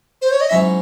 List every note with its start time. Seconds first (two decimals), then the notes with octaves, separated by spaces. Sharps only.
0.22 C5
0.31 C#5
0.41 D#5
0.50 G#2 F#3 C#4 E4 E5